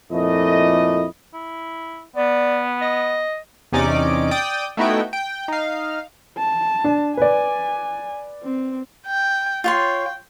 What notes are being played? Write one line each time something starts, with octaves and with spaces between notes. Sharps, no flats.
F2 A#2 A3 E4 D#5
E4
B3 D5
D#5
E2 C3 C#4 D#4 D5 D6
D5 G5 D#6
A3 B3 D#4 E4 F#4 G5
G5
D#4 F5
A5
D4
B4 D5 G#5
C4
G5
F4 C#5 G5 C6